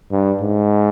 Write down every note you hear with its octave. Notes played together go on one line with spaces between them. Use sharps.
G2
G#2